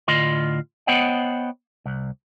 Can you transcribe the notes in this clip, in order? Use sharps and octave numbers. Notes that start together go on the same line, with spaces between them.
A2 D3 F4 D#5 C6
B3 C5 C#5 D#5 F#5 G5
C2